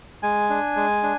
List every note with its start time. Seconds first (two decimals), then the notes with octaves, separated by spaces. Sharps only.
0.23 G#3 G#5
0.50 D4
0.76 G#3
1.03 D4